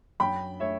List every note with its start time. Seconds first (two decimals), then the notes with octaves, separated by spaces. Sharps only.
0.20 F#2 G5 B5
0.60 A3 C#5 E5